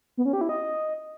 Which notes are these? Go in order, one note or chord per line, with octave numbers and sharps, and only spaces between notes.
B3
C#4
G4
E4
D#5